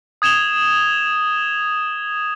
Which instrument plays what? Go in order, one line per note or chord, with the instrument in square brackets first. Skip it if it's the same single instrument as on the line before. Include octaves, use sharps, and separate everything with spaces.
[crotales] D#6 G#6 E7 F7 G7